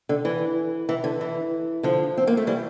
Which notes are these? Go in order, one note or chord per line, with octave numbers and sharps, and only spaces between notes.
D3
E3
E3
D3
E3
D3 F3
C4
A#3
A3
E3 G3